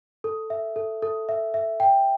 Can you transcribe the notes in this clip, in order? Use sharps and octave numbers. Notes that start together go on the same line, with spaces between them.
A4
E5
A4
A4
E5
E5
G5